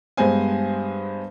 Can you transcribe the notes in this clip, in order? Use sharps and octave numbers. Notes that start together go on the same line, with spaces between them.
G2 G#3 B3 C5 G#5